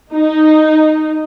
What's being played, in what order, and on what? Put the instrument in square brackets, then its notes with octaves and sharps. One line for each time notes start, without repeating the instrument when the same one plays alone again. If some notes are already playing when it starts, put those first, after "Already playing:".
[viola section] D#4